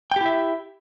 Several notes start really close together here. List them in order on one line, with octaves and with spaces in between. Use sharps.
G5 G4 E4 E5